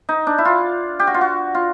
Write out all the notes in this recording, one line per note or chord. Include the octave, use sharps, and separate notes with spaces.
D#4
D4
E4
F4
G4
F#4
F4
F#4
F4